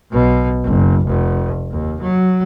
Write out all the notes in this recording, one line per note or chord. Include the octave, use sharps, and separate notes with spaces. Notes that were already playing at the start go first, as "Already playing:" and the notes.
B1 B2
F#1
F1
D#2
F#3